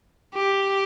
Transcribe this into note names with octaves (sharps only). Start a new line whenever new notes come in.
G4